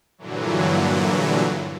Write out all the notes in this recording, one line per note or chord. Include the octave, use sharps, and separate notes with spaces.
G2 A#2 D3 E3 F#3